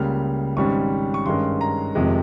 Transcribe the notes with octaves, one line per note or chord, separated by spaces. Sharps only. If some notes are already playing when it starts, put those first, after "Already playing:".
Already playing: C#2 C#3 G3 A#3 F6
G#1 G#2 G3 C#4 C#6
C#6
G2 D#3 G#3 C#4 C6
A#5
F1 F2 C3 D#3 G#3